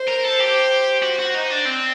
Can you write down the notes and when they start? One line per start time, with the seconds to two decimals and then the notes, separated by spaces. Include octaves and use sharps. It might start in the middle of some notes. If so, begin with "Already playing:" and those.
Already playing: C5
0.08 A#4
0.25 A4
0.40 G4
1.02 F#4
1.19 F#4
1.34 D#4
1.51 D4
1.66 C4